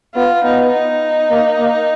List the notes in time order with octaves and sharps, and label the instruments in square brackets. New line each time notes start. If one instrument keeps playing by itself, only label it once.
[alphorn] B3 [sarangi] F4
[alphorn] B3 [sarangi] D#4
[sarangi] D#4
[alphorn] A#3
A#3